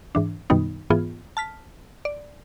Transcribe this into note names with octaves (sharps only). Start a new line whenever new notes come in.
G#2 E3 D4
F#2 B2 D#3 G3 B3 D#4
G#2 E3 B3 F4 G#4
A5 F6 B6
D5